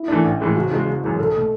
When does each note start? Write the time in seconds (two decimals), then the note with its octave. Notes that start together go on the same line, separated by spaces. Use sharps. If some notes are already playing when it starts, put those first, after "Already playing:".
Already playing: E4
0.08 E3 A3 D4
0.24 A1
0.40 A2 E3 G#3
0.55 F#1 F#4
0.71 E2 C#3 G#3
0.86 F#1
1.03 F#2 E3 G#3
1.19 B1 A4
1.35 B2 A3